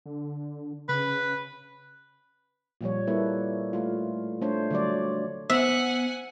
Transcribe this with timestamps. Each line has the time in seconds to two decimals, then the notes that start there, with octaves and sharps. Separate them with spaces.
0.06 D3
0.89 C#3 B4
2.81 A#2 F3 G3 C#5
3.07 G3 A#3 E4 A4 B4
3.73 A3 F4
4.42 A3 D4 C5 C#5
4.71 D3 F#3 G3 C#5 D5
5.50 B3 C5 E5 F#5 G#5